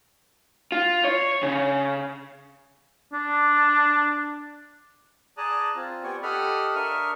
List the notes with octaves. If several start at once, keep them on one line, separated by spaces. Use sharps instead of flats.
F4
C#5
C#3
D4
G#4 D5 A5 A#5 D#6 F#6
C4 F4
B3 G4 D5 G#5 C#6
G4 A4 D#5 F#5 B5 F6
D4 A#4 E5 C#6 D#6 F6